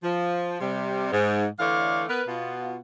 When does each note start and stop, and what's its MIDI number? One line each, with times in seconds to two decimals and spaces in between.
0.03 0.60 53
0.60 1.09 48
0.60 1.09 55
1.11 1.46 44
1.59 2.04 50
1.59 2.04 52
1.59 2.04 57
1.59 2.04 73
1.59 2.04 74
1.59 2.04 77
2.09 2.22 59
2.09 2.22 70
2.09 2.22 71
2.27 2.77 47
2.27 2.77 59
2.27 2.77 65